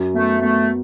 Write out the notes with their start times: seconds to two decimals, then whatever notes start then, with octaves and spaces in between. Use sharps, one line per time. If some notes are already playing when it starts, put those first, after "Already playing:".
Already playing: F#2
0.14 A3 B3
0.41 A3 B3